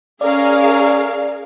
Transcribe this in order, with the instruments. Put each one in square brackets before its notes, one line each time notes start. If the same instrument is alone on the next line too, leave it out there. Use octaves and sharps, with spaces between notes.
[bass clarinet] C#4 [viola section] G#4 A#4 F5 [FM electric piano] D5